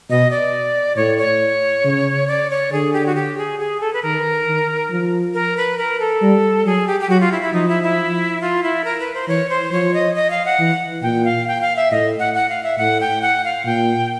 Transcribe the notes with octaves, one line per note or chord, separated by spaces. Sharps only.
B2 D#5
D5
A2 C#5
C#5
C#3
D5
C#5
D3 G#4
G4
F#4
G4
G#4
G#4
A4
B4
D#3 A#4
D#3
F3
A#4
B4
A#4
A4
G3
F#3 G#4
G4
G4
F#3 F#4
F4
E4
E4
F3 D#4
E4
E4
F4
E4
A#4
B4
C5
E3 C#5
C5
F3 C#5
D#5
D#5
F5
F#5
E3
A#2 G5
F5
G5
F5
E5
A2 D#5
F#5
F#5
F5
E5
A2 F#5
G5
F#5
F5
A#2 G5